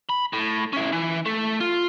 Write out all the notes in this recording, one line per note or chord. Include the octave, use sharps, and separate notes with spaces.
B5
A2
C#4 E4
E3
A3
F4